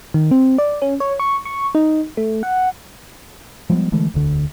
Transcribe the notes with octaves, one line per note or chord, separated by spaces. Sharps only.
D#3
C4
D5
C#4
C#5
C#6
C#6
D#4
A3
F#5
F3 G3 G#3 B3
D3 E3 G#3 A3
E1 D2 D3